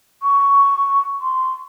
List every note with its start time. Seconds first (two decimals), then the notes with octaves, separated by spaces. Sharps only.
0.23 C#6
1.21 C6